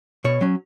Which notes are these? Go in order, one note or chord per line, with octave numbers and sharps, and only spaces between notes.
B2 C#5
F#3 C#4